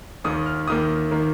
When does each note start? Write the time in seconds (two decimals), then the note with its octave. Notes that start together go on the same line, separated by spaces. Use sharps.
0.24 D#2 D#3 A#3 D#6
0.46 F6
0.68 D#2 D#3 A#3 D#6
1.11 D#3 A#3